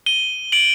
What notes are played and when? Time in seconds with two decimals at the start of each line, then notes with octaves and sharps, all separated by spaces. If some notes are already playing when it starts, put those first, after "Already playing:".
0.06 D#7 G7
0.52 D7 F#7